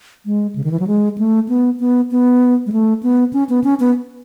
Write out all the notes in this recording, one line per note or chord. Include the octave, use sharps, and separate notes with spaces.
G#3
C#3
D#3
E3
F#3
G#3
A3
B3
B3
B3
G#3
A3
B3
C#4
B3
C#4
B3